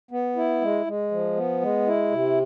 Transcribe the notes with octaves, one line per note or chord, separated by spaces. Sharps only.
B3
E4
G#3
G#3
F3
B3
G#3
E4
C3